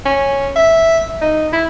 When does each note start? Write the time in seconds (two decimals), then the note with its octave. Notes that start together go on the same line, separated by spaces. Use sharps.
0.05 C#4
0.56 E5
1.21 D#4
1.52 E4